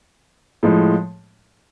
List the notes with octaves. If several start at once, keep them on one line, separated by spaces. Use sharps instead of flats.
A2 F3 G#3